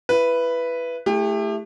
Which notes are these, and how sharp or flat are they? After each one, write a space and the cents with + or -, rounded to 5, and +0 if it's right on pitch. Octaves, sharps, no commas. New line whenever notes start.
E4 +20 B4 +0
A3 +0 E4 +0 G4 +35